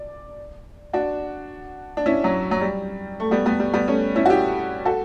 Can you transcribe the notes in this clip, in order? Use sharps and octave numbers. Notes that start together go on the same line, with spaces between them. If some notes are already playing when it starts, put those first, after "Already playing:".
Already playing: D5
D4 F#4
D4
C#4 E4
F#3
F#3
G3
A3
G3 B3
G3 B3
G3
G3 B3
A3 C#4
C#4 E4
F#4
E4 G4
F#4 A4